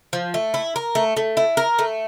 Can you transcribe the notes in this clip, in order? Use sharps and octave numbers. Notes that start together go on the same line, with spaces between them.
F3
A3
E4
A#4
A3
A3
E4
A#4
A3